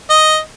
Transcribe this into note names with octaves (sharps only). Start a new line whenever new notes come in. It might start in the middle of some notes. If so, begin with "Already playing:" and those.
D#5